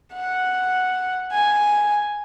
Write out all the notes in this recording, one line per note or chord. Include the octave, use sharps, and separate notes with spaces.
F#5
G#5